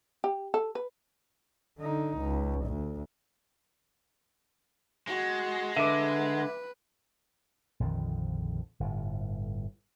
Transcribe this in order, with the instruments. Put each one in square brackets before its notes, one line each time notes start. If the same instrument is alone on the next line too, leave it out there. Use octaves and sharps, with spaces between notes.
[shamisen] G4
A4
B4
[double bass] D3 D#4
C#2
D2
[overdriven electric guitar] G#3 [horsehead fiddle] F#4
[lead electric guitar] D3 [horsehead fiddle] B4 [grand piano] E5 D6
[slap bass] A#1 F2 D3 D#3
G1 A2